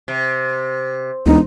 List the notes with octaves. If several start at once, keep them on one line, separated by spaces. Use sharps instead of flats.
C3
E1 D2 D#4